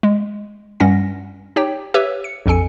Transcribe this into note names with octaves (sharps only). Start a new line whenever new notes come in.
G#3
G2 G3 C#4 F#5 A#6
D#4 G4 C#5 G5
G4 B4 C#5 E5 E6
C#7
A#1 F2 A4 G#5 C#7